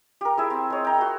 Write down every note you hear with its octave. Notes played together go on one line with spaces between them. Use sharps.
G4 A#4
E4 G#4 E5
C4
G#3 C#5
G5 A#5
F#4 G#4